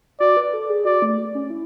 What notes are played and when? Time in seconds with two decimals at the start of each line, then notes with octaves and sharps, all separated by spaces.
0.20 F#4 D5
0.37 B4
0.54 A4
0.70 G#4
0.85 F#4 D5
1.02 A3
1.35 C#4
1.50 E4